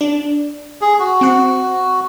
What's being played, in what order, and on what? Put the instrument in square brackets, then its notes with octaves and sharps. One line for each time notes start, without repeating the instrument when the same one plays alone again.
[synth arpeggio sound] D4
[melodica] G#4
F#4
[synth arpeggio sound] C4 F#5